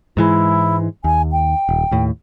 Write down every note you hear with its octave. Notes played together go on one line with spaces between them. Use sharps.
G#2 E3 G#3 E4
D#2 G#5
G5
D#1
D#2 A2